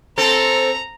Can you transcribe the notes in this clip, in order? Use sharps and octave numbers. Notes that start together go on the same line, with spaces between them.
C4 A4 A#5